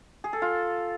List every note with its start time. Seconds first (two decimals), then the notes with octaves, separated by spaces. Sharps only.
0.24 G#4
0.33 A4
0.42 F4